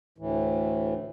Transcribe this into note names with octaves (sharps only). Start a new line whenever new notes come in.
D2 A2 E3